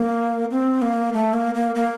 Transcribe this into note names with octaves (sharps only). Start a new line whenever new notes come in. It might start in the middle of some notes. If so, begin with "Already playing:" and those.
Already playing: A#3
C4
A#3
A3
A#3
A#3
A#3